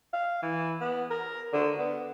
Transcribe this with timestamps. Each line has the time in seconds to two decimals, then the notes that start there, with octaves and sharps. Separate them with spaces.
0.13 F5
0.43 E3
0.81 B3
1.11 A#4
1.53 D3
1.79 B3